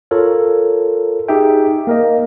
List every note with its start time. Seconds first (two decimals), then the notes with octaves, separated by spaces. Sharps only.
0.11 F4 A4 A#4 C#5
1.28 D#4 G4 G#4 E5 G5
1.87 A#3 A#4 D#5